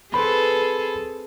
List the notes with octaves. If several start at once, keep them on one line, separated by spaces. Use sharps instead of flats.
C4 G#4 A4 B4 B5